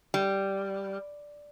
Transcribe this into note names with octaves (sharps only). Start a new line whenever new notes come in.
G3